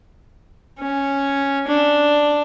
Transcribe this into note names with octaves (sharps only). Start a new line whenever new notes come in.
C#4
D4